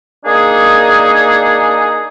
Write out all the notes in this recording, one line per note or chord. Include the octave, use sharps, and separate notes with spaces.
A#3 D4 D#4 G#4